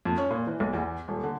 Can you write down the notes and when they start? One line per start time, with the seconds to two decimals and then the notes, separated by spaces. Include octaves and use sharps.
0.05 F2
0.18 C#4
0.30 A#2
0.47 E3
0.60 B1
0.73 E2
1.08 D#1
1.23 D3